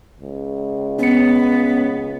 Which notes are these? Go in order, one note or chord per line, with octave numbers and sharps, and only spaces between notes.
C#2
B3 C#4 C#7